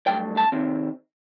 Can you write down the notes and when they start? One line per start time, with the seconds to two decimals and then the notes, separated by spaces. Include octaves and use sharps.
0.07 G2 F#3 A3 G5
0.37 A5
0.52 C3 D#3 C4